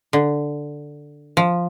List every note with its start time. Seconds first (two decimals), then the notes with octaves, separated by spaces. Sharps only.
0.13 D3
1.37 F3